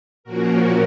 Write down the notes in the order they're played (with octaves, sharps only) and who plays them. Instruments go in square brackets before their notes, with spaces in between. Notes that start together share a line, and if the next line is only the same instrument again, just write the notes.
[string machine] A#2 F3 A#3 C#4 F#4 A#4